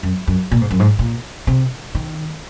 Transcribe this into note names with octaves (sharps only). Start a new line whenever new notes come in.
F#2
F#2
A#2
G#2
F#2
G#2
A#2
C3
D#3